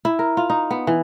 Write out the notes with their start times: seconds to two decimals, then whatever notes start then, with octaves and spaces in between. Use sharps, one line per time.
0.05 E4
0.19 A#4
0.37 F4
0.50 D#4
0.71 B3
0.87 E3